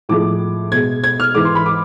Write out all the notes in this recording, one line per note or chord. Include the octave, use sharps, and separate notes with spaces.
A2 F3 G#3 D6
B2 G#3 G#6
G#6
F6
G#2 E3 G#3 D6
C6
B5
D6